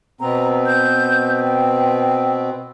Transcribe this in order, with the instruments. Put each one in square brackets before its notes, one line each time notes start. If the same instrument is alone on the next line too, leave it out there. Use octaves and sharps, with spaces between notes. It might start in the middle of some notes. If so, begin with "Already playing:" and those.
[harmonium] B2 B3 C4 [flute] A#5
[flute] G6
G5